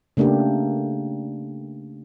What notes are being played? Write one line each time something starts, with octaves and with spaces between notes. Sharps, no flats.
C#3 A3 A#3 D4 G4